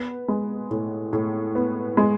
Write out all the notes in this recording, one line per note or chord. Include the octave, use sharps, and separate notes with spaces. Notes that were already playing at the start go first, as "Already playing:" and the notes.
Already playing: B3
G#3
A2
A2
B3
G#3